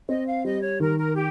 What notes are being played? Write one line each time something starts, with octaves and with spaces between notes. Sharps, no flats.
C4 D#5
F5
G3 D#5
C#5
D#3 A#4
A#4
G4